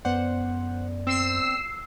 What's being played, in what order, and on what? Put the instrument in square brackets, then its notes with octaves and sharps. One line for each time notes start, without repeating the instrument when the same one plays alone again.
[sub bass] F#2 [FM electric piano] B3 D5 [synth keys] C5 F#5
[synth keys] C4 [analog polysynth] E6 C7